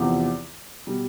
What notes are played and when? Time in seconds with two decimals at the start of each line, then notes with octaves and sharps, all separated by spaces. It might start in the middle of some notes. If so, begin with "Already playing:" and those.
Already playing: E2 C3 F3 C4 G4
0.87 B2 G3